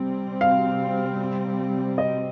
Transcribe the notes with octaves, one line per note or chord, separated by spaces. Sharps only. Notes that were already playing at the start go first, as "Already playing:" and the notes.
Already playing: C3 G3 C4
F5
D#5